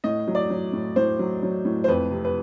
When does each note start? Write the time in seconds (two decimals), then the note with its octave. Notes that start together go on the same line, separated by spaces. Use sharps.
0.04 A2 D#5
0.27 F#3
0.35 D5
0.50 F#3
0.73 A2
0.96 A2 C5
1.19 F#3
1.43 F#3
1.65 A2
1.84 C5
1.88 F2 B4
2.11 C3
2.25 B4